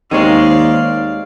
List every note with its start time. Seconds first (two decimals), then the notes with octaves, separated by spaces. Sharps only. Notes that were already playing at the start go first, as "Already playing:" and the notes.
0.11 D#2 G#3 C4 D#4 C#5 D5 F5